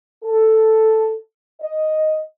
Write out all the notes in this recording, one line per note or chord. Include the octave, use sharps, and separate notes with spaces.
A4
D#5